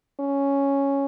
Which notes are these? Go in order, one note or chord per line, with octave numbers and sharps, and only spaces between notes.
C#4